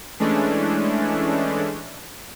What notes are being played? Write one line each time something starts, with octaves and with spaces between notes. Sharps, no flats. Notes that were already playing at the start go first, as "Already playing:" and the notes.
E3 G#3 A3 C#4 D4